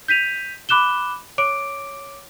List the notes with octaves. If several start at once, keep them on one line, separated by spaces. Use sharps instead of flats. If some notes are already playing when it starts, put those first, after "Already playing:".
G6 B6 D#7 F7
B5 D6 F#6 E7 G7
C#5 D6 D7